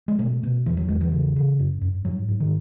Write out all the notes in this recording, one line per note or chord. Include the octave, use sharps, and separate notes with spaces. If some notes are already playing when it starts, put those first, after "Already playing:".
G#3
B2 A3
B2
E2 E3
F#3
E2 G#3
E3
C#3
C#3
F#2
F#2
G#2 F#3
G#2
D#3